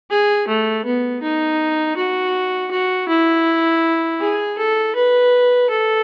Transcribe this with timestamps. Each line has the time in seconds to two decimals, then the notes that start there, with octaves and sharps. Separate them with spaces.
0.10 G#4
0.48 A3
0.85 B3
1.22 D#4
1.97 F#4
2.71 F#4
3.09 E4
4.20 G#4
4.58 A4
4.96 B4
5.70 A4